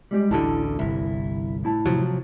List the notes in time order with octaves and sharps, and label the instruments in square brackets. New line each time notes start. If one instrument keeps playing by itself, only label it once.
[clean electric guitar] G3 G#3 G4
[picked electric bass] A1 D2 D3 [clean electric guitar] E4 A5
[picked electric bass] G1 C2 [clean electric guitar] E4
[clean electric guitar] A2 E4 A5
[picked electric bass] C3 F3 F#3